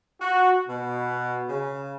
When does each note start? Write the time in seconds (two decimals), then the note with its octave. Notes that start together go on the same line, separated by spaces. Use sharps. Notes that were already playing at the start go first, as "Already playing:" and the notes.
0.21 F#4
0.68 B2
1.48 C#3